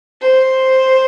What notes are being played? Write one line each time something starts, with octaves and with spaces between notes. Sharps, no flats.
C5